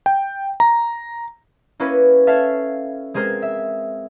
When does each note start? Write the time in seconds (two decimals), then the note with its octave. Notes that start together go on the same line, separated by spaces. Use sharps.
0.06 G5
0.60 A#5
1.80 A#3 C#4 E4 F#4 B4
2.27 A4 C#5 E5 F5
3.14 G#3 C4 G#4 A#4 C5
3.42 E5